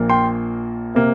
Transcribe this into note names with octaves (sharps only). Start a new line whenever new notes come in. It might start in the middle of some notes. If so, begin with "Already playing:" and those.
Already playing: A#1 A#2 A#3
G5 C6
C3 A#3